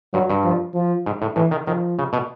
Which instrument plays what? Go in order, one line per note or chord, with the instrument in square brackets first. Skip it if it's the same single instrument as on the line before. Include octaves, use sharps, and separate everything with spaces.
[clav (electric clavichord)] G2 [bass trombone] F#3
[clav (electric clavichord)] G2
[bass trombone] F3
F3
[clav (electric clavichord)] G#2
A2
[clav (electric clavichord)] A2 [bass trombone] E3
[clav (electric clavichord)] D#3
[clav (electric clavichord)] D#3 [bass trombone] F3
[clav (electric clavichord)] C#3
B2